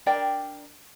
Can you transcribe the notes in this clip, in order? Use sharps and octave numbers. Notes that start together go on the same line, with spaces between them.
D4 A#4 D5 G5